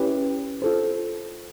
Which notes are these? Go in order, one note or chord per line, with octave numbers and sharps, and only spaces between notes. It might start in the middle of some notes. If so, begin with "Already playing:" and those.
Already playing: C#4 E4 G4 B4
F4 A4 C5